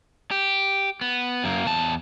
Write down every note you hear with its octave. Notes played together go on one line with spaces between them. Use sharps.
G4
B3
F#2 A#3
E2 A5